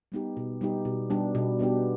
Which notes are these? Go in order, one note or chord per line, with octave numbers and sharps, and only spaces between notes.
G3 B3 D#4 G4
B2
G3 B3 D#4 G4
B2
G3 B3 D4 G4
B2
G3 B3 D4 G4